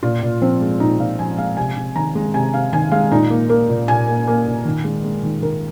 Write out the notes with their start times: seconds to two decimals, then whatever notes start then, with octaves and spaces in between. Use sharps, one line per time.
0.03 A#2 F4
0.22 A#2
0.41 F3 C4
0.61 G#3
0.80 A#2 D#4
0.99 A#2 F5
1.19 F3 G#5
1.38 G#3 F5
1.57 C3 G#5
1.77 C3
1.96 D#3 A#5
2.15 G#3
2.34 C3 G#5
2.54 C3 F5
2.73 D#3 G#5
2.92 G#3 F5
3.11 A#2 D#4
3.30 A#3
3.49 A#3 A#4
3.69 A#2
3.88 A#2 G#5
4.08 A#3
4.27 A#3
4.47 A#2
4.65 D#3
4.84 G#3
5.04 G#3
5.23 D#3
5.42 D#3 A#4